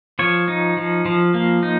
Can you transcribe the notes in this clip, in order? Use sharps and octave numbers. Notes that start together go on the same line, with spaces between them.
F3 C#5
D#4
F3
F3
A#3
D#4